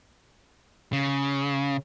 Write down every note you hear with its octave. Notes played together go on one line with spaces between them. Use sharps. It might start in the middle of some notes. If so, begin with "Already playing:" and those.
C#3